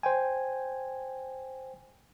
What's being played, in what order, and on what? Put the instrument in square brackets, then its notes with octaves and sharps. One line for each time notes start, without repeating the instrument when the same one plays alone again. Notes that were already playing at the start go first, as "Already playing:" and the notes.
[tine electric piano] C5 G5 G#5